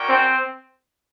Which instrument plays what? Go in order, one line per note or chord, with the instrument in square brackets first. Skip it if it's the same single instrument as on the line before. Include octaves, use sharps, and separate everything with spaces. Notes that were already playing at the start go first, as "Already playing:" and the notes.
Already playing: [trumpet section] C#4 F#4 A#4 D5 G5
[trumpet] C4